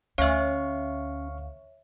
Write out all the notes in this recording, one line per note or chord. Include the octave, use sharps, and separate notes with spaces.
D2 C#4 C#5 E5 F5 C#6